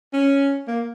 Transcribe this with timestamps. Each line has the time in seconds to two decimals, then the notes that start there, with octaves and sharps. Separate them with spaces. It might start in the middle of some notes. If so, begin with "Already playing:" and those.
0.14 C#4
0.68 A#3